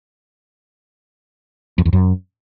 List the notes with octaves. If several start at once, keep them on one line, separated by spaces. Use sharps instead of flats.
F2
E2
F#2